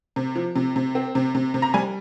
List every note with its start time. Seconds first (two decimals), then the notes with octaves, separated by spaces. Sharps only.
0.16 C3
0.36 F3
0.56 C3
0.76 C3
0.95 C4
1.15 C3
1.35 C3
1.54 C3
1.62 A#5
1.74 G3 G#5